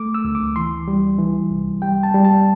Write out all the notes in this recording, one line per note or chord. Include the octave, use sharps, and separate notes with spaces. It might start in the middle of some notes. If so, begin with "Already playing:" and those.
Already playing: A3 D6
E6
D2
D6
E3 C6
G3
E3
C2
G3 G5
A5
G3
A5